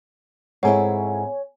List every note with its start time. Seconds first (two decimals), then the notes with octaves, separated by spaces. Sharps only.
0.63 G#2 C4 E4 G#4 A4 C#5 F#5 G#5